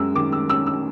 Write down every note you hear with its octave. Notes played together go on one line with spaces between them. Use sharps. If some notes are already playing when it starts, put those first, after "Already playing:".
Already playing: F#2 G#3 E6
D#3 D6
E6
C#4 E6
E6